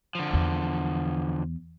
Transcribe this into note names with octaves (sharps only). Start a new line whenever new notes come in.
D3 F3
E2